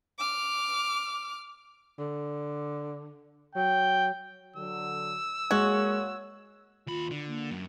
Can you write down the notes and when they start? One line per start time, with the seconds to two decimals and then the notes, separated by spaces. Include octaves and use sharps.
0.19 D6 F6
1.98 D3
3.55 F#3 G5
4.56 D3 F#3 E6
5.51 G#3 A#3 F#4 C#5 G#6
6.87 D#2 F4 B5
7.11 D3
7.27 A#3
7.51 F#2